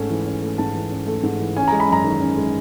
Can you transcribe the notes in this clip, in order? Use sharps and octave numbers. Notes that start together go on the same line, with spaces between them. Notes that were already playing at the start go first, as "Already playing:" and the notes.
Already playing: G#2 A3 C#4
E3
C#4
A3
G#2 A5
E3
C#4
A3
G#2
E3
C#4 G#5
G#3 A#5
B5
F#2 A#5
D#3
C#4
G#3